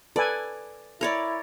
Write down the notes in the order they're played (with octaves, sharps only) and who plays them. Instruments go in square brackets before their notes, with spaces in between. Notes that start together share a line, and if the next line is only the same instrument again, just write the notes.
[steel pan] A4 B4 G#5 [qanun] D5
[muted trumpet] E4 [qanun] A#4 C#5 D5